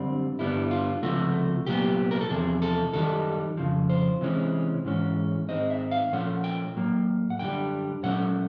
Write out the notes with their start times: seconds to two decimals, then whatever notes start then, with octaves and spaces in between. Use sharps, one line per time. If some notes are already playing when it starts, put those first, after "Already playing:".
Already playing: F#2 D3 G3 C4
0.39 G2 D3 G3 B3 E4
0.71 F4
1.03 C#2 C3 F3 A3 F#4
1.66 C2 A#2 F#3 B3 G4
2.11 A#4
2.21 A4
2.30 E2 C3 F3 G#4
2.62 A4
2.93 F#2 D#3 G3 A4
3.57 F2 C#3 F3
3.89 C5
4.21 C3 E3 G#3 C#4
4.85 G#2 E3 G#3 C#4
5.49 G#2 D#3 G#3 C4 D#5
5.70 E5
5.91 F5
6.12 A#2 F3 A3 C#4 F#5
6.44 G5
6.76 A2 F#3 A#3
7.30 F#5
7.39 F#2 D3 G3 G5
8.03 A#2 F#3 A3 C#4 F#5